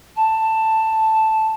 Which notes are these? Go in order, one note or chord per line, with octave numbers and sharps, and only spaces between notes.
A5